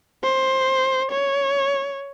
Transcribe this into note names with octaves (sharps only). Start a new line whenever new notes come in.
C5
C#5